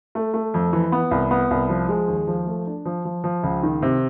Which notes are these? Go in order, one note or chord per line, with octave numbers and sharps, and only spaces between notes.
A3
A3
F2
E3
B3
C2
B3
C2
F3
G#3
D#2
F3
A3
D4
F3
F3
F3
C#2
D#3
C3